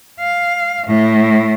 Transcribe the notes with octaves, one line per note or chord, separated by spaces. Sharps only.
F5
A2